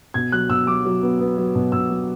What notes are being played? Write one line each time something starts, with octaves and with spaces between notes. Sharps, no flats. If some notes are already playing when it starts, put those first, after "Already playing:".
B2 G#6
F#3 F#6
B2 E6
F#3 D6
F#3
B3
B3
F#3
B2
B2 E6
F#3